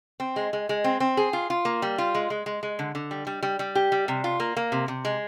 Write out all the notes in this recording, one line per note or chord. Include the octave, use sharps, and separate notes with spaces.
C4
G#3
G#3
G#3
C4
C4
G#4
F4
F4
A#3
G3
F4
G#3
G#3
G#3
G#3
D3
D3
G3
G3
G3
G3
G4
G3
C3
F4
A#3
A#3
C3
C3
G#3